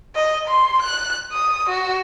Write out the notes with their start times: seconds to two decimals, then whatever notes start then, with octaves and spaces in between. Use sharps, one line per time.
0.15 D#5
0.48 C6
0.82 F#6
1.32 D#6
1.70 F#4